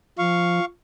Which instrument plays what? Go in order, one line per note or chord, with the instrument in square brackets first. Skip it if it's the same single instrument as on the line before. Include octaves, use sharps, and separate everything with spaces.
[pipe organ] F3 [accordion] F5 C#6